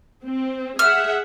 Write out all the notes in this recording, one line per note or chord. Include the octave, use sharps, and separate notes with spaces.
C4
G#4 E5 F#5 F6